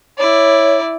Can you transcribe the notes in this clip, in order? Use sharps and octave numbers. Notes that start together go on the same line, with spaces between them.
E4 C#5 D5